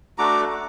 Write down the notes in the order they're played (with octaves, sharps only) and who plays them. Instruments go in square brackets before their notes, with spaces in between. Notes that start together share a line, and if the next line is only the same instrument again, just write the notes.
[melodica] A3 D4 F#4 A#5 D6